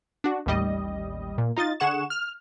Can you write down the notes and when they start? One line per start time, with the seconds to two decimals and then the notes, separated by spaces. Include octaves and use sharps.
0.24 D4 F#4
0.46 A1 D#2 G3 D#5
1.38 A#2
1.56 D#4 F4 D#5 A6
1.80 D3 G#4 F#5 C#6 E7
2.10 F6